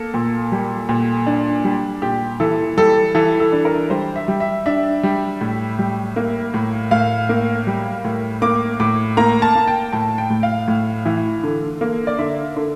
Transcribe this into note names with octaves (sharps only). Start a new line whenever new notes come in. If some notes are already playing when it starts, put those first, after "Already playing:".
Already playing: A#3 A4
A#2
G3
A#2
D4
G3
A#2 G4
E3 A4
G3 A4
E3 A4
A4
D4
A#4
G3 C5
E5
G3
E5
D4 E5
G3
A2
G3
A#3
A2
A2 F5
A#3
G3
A2
A#3 D6
A2 D6
A#3 A#5
A5
A#3
G5
A2 A5
G5
A2
F5
A2
E3
D3
A#3
D5
D3 E5
D3